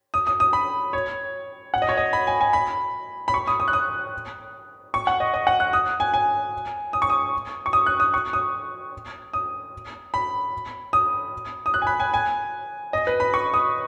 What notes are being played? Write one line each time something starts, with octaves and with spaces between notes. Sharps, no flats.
D#6
D#6
D#6
B5
C#5
F#5
D#5
C#5
D#5
B5
G#5
G#5
B5
B5
C#6
D#6
D#6
F#6
D#6
C#6
F#5
D#5
D#5
F#5
F#6
D#6
G#5
G#5
D#6
C#6
D#6
C#6
D#6
F#6
D#6
C#6
D#6
D#6
B5
D#6
D#6
F#6
G#5
B5
G#5
G#5
D#5
B4
B5
C#6
D#6